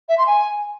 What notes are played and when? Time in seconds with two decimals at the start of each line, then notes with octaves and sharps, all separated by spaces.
0.09 E5
0.18 C6
0.27 G#5